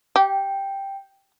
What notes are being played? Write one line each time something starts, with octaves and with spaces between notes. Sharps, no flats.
G4 G5